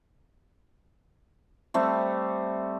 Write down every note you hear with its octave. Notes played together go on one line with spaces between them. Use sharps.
G3 A3 C4